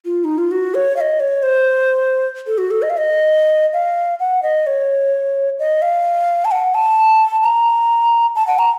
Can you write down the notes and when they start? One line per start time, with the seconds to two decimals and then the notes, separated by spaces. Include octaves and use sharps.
0.05 F4
0.24 D#4
0.38 F4
0.51 F#4
0.74 C#5
0.96 F5
1.01 D#5
1.20 C#5
1.43 C5
2.47 A4
2.58 F#4
2.71 A4
2.82 D#5
2.90 F5
2.97 D#5
3.73 F5
4.20 F#5
4.43 D#5
4.66 C#5
5.59 D#5
5.82 F5
6.45 A5
6.51 F#5
6.74 A5
7.43 A#5
8.35 A5
8.47 F#5
8.59 A#5